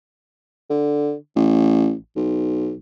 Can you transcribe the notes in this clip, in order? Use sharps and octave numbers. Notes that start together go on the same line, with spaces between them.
D3
A1
B1